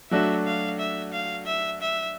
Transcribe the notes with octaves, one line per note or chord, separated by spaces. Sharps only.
F#3 A3 D4 F#4 E5
F5
E5
F5
E5
E5